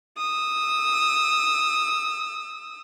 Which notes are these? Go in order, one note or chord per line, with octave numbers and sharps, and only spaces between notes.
D#6 E6